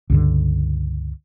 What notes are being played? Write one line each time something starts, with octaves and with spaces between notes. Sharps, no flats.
C#2 G2 D3